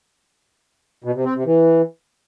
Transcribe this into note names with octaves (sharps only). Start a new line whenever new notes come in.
B2
C3
C4
C3
E3